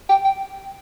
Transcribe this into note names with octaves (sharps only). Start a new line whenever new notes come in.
G5
G5